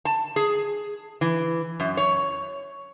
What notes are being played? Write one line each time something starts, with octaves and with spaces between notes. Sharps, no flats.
A5
G#4
E3
F#2
C#5